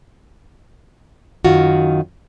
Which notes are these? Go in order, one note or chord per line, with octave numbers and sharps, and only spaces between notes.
F#2 D#3 F4 F#4